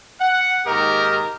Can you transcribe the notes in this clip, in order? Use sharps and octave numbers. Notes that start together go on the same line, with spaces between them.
F#5
G#2 D#3 A#3 G4 A#4 D#5